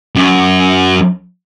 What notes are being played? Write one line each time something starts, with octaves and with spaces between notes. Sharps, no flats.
F#2